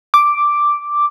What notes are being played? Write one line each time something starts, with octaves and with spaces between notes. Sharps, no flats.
D6